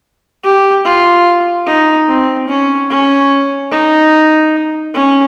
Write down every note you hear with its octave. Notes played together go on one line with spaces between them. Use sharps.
G4
F4
D#4
C4
C#4
C#4
D#4
C#4